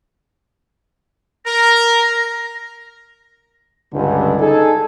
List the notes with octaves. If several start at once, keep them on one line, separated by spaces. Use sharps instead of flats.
A#4 A#6
C#2 G2 D3
D#4 G#4 A4